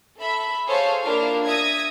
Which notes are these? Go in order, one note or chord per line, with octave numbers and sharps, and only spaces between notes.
A4 E5 B5
G#4 A4 C5 C#5 F5 A5
A#3 D4 E4 F4 A#4 F5
E5 D#6 G#6 A#6